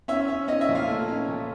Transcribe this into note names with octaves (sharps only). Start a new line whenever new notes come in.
C#4 E5
C#4
C#4 D#5
E5
A#2
F5
A3
C#4
A#2